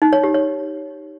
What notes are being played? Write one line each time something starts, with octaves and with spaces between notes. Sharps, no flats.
D#4
C#5
G4
C#5